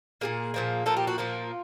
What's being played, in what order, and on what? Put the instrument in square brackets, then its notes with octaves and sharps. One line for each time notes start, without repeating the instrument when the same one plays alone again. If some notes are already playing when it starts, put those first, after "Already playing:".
[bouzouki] A#2 F3 A#3 G#4
A#2 F3 A#3
A#2 F3 A#3 A4
G4
F#4
A#2 F3 A#3 F4